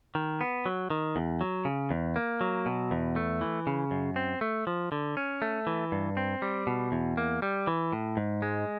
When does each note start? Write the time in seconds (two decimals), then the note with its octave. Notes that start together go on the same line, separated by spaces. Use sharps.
0.15 D#3
0.41 B3
0.66 F#3
0.90 D#3
1.16 E2
1.41 F#3
1.65 C#3
1.91 E2
2.16 A#3
2.41 F#3
2.66 B2
2.91 E2
3.16 A3
3.41 E3
3.67 C#3
3.91 F#2
4.16 C4
4.41 A3
4.67 F3
4.92 D3
5.17 C#4
5.42 A3
5.67 E3
5.92 G2
6.17 C4
6.42 G3
6.67 B2
6.92 E2
7.17 A#3
7.42 G3
7.67 E3
7.93 A2
8.17 G#2
8.42 G#3